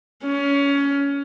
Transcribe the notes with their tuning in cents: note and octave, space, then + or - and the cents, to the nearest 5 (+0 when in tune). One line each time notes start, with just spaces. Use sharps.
C#4 +20